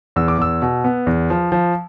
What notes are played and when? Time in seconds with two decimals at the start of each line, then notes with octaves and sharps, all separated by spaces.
0.16 E2 E6
0.28 D6
0.38 E2 E6
0.62 B2
0.84 B3
1.07 E2
1.30 F3
1.52 F3